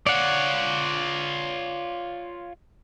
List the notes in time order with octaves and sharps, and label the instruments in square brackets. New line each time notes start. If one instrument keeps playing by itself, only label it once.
[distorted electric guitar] F4 C#5 [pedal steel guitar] D5 F#5